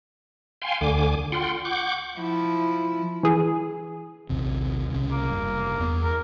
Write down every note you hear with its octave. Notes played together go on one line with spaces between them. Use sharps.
F5 G5 G#5 C6
D2 D3 G#5 D6
F4 F#5 G5 C6
F#5 C#6 D6 G6
F3 E4
E3 G#4
A#1 D#2 C3
C2 C#3
A#3
F1 G2
E2 B3
A#4